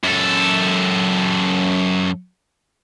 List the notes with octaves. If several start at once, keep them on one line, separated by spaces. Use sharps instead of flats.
F#2 A4